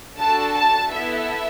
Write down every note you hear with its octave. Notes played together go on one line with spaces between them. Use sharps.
D4 F#4 A4 A5
A5
B3 E4 A4 E5